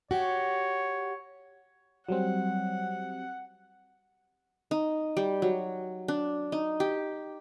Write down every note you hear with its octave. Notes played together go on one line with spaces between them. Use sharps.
F#4 G4 C#5
F#3 G3 C4 F#5
D#4
G3
F#3
D4
D#4
G4